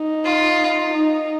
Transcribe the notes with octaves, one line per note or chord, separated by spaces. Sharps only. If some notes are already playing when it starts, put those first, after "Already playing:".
Already playing: D#4
F4
D#4